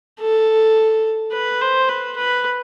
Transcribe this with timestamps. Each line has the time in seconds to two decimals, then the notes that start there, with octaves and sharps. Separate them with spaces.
0.21 A4
1.33 B4
1.61 C5
1.89 B4
2.17 B4